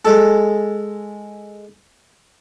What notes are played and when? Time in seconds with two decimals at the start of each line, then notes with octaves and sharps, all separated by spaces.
0.05 G#3 A4